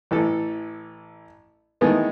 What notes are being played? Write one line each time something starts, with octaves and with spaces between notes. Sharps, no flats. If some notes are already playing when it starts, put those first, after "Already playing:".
A1 E3 A4
D#3 E3 G#3 A3 B3